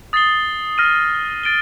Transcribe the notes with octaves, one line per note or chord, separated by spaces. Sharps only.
D#6 A6 C7 G7
F6 A#6 D#7
A6 D7 G7